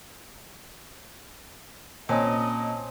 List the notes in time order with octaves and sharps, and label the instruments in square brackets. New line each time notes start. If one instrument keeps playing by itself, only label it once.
[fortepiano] A#2 [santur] C4 C#4 [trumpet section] D#5 [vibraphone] A5